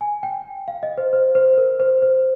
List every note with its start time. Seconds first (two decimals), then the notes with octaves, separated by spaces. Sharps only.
0.01 G#5
0.23 G5
0.68 F5
0.83 D#5
0.98 C5
1.13 C5
1.35 C5
1.58 A#4
1.80 C5
2.02 C5